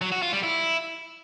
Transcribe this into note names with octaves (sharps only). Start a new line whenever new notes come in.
F#3
F#4
F4
G3
E4